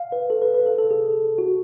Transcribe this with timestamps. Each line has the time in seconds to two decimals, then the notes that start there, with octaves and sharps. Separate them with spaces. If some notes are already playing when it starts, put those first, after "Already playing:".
Already playing: F5
0.12 B4
0.30 A4
0.42 B4
0.54 B4
0.66 A4
0.78 A4
0.91 G#4
1.38 F#4